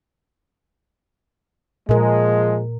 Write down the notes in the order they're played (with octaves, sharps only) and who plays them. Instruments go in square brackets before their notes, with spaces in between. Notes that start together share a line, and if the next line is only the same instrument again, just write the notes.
[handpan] A#2 A#4 [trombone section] F3 G#3